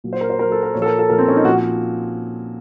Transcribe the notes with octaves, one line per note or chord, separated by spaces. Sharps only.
A#2 F#3
C5
A#4
C5
A#2 F#3 A#4
A4
A#4
A#2 F3 C#5
A4
A#4
A4
A#2 F3 A#4
C4
C#4
D#4
A#2 F3 F#4